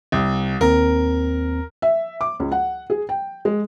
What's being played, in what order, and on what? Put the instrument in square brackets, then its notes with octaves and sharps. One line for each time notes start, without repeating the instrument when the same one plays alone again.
[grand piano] C2
[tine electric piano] D#2 C4 [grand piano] A#4
[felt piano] E5
D6
C#2
F#5
G#4
G5
G#3